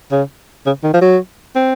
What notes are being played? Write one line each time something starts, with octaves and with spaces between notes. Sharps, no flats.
C#3
C#3
D#3
F3
F#3
C4